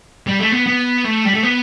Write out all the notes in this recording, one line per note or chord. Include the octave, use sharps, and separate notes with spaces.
G3
A3
B3
B3
A3
G3
A3
B3